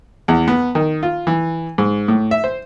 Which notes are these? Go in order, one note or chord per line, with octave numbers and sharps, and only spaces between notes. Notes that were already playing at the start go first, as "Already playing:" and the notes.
E2
B3
D#3
F4
E3
G#2
A2
E5
C5